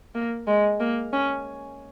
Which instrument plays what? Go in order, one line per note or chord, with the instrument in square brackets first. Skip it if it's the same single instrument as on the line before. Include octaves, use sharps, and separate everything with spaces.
[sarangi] A#3
G#3
A#3
C#4